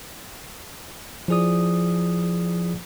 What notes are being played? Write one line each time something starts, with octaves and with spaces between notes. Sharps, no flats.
F3 E4 G#4 D5 D#6